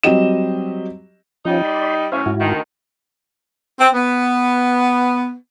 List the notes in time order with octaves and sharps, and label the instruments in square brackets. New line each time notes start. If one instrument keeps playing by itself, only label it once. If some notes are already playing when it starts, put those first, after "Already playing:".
[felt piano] F#3 G3 C4 G4 D#5 E7
[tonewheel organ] F3 C#4 F4 [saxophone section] G3 D#4
[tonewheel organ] D5 B5 C6
[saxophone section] A2 F#3 C#4 [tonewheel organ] C5 E5 F5
[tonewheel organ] G#2 E4 F#4
[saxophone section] D2 D#3
C4
B3